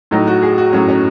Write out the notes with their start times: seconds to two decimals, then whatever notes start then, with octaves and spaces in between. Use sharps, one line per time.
0.11 A2 F#3 D#4
0.27 F#4
0.42 G#4
0.58 F#4
0.72 A2 F#3 C#4
0.88 C#4